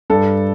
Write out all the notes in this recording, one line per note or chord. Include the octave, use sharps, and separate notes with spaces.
G2 A4